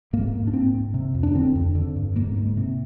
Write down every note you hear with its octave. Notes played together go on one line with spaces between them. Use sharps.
G#2 A#3
G#2
D4
G#2 C4
G#2
C3
F2
D4
D3 C4
F2
D3
G2
G#2 A#3
G#2
C3